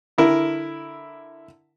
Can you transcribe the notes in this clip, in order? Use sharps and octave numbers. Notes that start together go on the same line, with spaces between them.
D3 E4 A#4